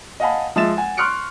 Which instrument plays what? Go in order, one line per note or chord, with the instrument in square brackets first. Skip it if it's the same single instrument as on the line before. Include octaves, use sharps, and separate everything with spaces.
[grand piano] D#5 F5 F#5 G#5 A5 B5
F3 G#3 E5 A6 E7
F#5 G#5
C6 C#6 F6 F#6 C#7 D7